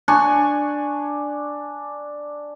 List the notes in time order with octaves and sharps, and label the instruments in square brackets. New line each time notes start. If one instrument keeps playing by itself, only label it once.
[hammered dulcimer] D4 G#5 C#6